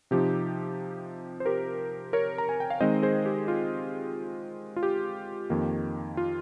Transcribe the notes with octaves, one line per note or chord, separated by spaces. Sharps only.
C3 F3 C4 D#4 G4
C5
G4 A#4
A#4 C#5
A#5
G#5
G5
F5
D#3 G#3 C4 D#4 C5 D#5
G#4 C5
G4
F4
F4
G4
F2 D#3 A#3
F4